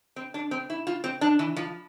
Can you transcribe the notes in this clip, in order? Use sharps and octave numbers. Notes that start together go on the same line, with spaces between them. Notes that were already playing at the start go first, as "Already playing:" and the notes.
C4
D4
C4
E4
F4
C4
D4
E3
F3